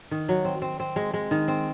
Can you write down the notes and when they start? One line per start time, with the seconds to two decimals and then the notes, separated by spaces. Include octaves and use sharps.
0.11 D#3
0.29 F#3
0.45 C4
0.62 C4
0.80 C4
0.96 G#3
1.14 G#3
1.31 D#3
1.48 C4